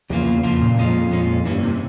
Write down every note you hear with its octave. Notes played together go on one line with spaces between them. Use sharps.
E2 C#3 F3 A#3 F4
E2
F2 C#3 F3 A#3 F4
A#2
F2 A#2 G#3 C#4 F4
A#2 G#3 C#4 F4
G2 E3 A#3 C#4
C3